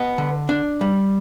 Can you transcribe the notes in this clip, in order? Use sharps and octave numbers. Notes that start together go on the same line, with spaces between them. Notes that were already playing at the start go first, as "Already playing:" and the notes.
Already playing: B3 D#5
D3
D4
G3